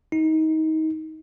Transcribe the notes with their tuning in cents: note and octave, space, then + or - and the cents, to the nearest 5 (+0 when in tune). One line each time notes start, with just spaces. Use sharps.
D#4 +25